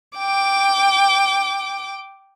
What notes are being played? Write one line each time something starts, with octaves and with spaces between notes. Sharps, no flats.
G5 D6